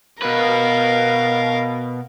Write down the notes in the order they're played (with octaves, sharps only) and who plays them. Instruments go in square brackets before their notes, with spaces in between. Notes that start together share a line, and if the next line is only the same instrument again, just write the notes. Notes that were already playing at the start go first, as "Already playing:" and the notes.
[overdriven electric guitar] B2 B4 [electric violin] A#4 F5